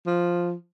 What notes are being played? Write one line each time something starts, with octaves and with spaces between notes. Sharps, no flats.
F3